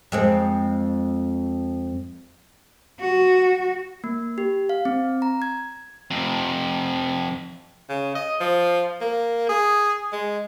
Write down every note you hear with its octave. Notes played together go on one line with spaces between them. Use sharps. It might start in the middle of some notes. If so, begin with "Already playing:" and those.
F2 G#3 C4
F#4
A#3
G4
F5
C4
A#5
G#6
F2 C3
C#3
D#5
F3
A#3
G#4
G#3